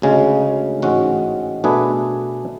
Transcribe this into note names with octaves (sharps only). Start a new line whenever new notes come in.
D2 C#3 G#3 C#4
A1 G#2 G#3 C#4 F#4
B2 A3 D4 G#4 B4